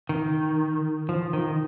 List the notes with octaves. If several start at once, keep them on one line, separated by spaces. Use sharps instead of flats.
D#3
F3
D#3